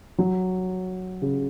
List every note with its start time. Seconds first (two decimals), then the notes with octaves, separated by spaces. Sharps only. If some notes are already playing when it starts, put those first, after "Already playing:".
0.18 F#3
1.22 C#3